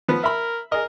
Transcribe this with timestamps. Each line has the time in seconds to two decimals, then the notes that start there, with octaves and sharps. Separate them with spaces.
0.08 F3 B3
0.23 A#4 E5 B5
0.72 G#4 A#4 D#5